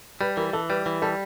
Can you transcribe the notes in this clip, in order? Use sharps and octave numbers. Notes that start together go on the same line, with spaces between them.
G3 B4
E3 A#4
E3 A4
G3 B4
E3
G3 A4